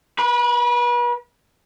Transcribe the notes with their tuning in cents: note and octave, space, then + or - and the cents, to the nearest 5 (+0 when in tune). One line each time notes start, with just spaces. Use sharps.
B4 -35 B5 +0